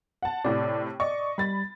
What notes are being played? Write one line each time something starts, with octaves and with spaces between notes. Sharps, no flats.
F#5 A5
A2 C3 D5
D5 D#5 C#6
G3 B5 A6